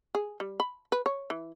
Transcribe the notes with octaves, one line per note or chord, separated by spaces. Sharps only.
G#4
G3
B5
B4
C#5
E3